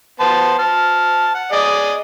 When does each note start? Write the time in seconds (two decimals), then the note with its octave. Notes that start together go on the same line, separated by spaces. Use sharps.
0.20 B3 C5 A5
0.59 A5 F6
1.34 F#5
1.52 G#4 D5 D#5